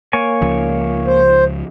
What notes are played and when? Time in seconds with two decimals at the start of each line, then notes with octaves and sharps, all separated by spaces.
0.13 A#3 C#5 G#5
0.42 C#2 C#3 F3
1.07 C5